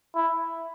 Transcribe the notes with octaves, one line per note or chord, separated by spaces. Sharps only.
E4